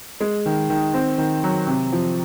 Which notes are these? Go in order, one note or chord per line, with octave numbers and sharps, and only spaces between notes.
G#3
D#3
D#3
C4
D#3
F#3
C3
F3